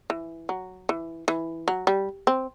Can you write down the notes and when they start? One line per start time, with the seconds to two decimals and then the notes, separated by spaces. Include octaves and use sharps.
0.10 E3
0.49 F#3
0.89 E3
1.28 E3
1.68 F#3
1.87 G3
2.27 C4